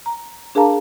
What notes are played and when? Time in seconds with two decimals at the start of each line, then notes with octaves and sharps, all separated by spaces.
0.06 A#5
0.55 D4 G#4 A#4 F5 A5 A#5